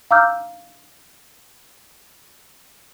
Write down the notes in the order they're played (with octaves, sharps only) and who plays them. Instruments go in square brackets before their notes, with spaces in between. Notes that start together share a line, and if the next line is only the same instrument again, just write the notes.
[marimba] F5 A#5 D6 E6 F6 G6